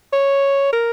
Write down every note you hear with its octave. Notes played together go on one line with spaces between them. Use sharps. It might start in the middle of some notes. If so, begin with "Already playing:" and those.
C#5
A#4